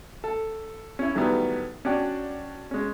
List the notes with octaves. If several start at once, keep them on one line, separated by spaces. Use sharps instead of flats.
A4
C#4 E4
A2 D#3 F#3 G3 A3 B3
C#4 D4 F#4 D5 G5
G#3 C#4